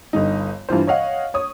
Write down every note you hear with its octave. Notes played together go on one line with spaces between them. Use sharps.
G1 G2 D#4
G2 E3 F4 C5
C#5 D#5 F5 F#5
C#5 D#6